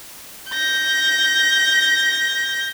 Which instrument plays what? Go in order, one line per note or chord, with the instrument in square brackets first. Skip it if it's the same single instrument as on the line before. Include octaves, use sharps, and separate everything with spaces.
[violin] G6 A#6